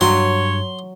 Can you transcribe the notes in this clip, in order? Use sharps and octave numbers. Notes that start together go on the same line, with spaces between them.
G2 F#3 C#5 C6